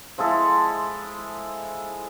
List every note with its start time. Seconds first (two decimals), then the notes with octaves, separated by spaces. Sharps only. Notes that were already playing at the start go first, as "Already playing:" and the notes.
0.18 F3 G#3 E4 A4